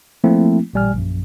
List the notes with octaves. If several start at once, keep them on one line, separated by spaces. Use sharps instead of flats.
F3 A3 A#3 C4 E4
A1 A#2 G3 G#5 F6
A#1 F#2